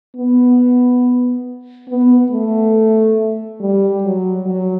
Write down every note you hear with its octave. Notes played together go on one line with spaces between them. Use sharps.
B3
B3
A3
G3
F#3
F#3